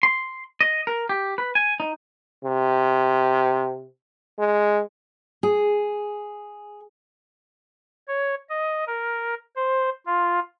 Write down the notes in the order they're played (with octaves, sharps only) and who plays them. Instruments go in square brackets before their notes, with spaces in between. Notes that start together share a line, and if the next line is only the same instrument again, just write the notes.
[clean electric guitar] C6
D#5
A#4
G4
B4
G#5
D#4
[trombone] C3
G#3
[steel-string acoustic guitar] G#4
[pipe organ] C#5
D#5
A#4
C5
F4